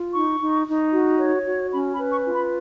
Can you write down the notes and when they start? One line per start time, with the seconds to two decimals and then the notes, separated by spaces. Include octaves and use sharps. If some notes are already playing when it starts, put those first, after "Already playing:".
Already playing: F4
0.13 D#4 C#6
0.40 D#4
0.67 D#4
0.92 F#4
1.19 C#5
1.46 F#4
1.72 C#4 B5
1.93 B5
1.98 B4
2.11 C#6
2.25 F4
2.32 B5